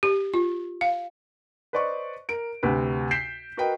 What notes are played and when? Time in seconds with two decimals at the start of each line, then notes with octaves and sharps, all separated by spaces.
0.03 G4
0.34 F4
0.81 F5
1.73 B4 C5 D5 D#5 C#6
2.29 A#4 D7
2.63 D2 C3 B4
3.11 G6 B6 C7 D7 E7
3.57 F#4 A#4 B4 D#5 G5